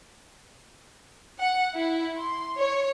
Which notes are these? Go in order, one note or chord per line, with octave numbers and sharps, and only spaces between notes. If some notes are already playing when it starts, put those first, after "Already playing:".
F#5
E4
C6
C#5